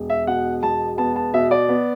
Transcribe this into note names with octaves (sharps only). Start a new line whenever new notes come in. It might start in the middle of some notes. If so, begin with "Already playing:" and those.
Already playing: E1
E5
B2 F#5
E1 A5
B3 A5
A5
B2 E5
D5
B3